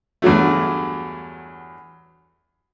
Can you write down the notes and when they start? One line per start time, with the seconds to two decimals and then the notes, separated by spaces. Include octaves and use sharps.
0.22 E2 G2 F#3 A3